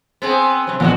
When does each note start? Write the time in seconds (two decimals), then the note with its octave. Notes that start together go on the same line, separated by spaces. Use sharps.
0.22 B3 C4 G#4
0.67 C3 F#3
0.80 A#1 E2 B2 B3 F#4